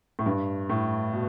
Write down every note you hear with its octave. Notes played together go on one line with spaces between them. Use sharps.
A2
G2
A2
B2